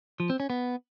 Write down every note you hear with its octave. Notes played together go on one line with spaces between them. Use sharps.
F3
C4
C#4
B3